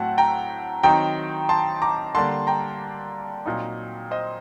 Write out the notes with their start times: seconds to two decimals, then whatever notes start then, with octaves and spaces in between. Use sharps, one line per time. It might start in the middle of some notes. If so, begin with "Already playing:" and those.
Already playing: A2 F#3 A3 C4 F#5 A5
0.18 G5 A#5
0.83 D#3 F#3 C4 D#4 G5 A#5
1.49 A5 C6
1.82 A#5 D6
2.15 D3 G3 A#3 D4 A5 C6
2.47 G5 A#5
3.46 A#2 F#3 C4 D#4
4.11 C5 D#5